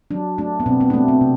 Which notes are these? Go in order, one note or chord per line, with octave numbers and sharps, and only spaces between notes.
F#3 D4
A3 D4
B3
B2 C4
B3
D4
A3 C4
C4
C3